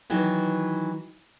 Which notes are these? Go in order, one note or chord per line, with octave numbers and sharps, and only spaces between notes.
D#3 E3 F#3